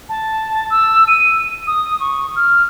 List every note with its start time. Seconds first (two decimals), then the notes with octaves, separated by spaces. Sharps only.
0.09 A5
0.70 E6
1.08 D#7
1.67 D#6
2.00 C#6
2.36 F6